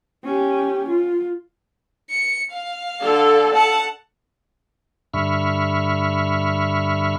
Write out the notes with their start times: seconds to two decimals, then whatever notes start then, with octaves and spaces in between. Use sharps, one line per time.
0.24 C#4 G4
0.89 F4
2.10 C#7
2.53 F5
3.04 D3 A4
3.55 F#5 A5
5.14 G2 D3 E5 B5 C#6 F6